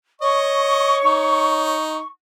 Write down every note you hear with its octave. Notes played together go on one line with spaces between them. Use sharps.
C#5 D#5 C#6
D#4